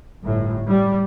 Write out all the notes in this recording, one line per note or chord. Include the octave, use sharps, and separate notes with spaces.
G1 A2
G3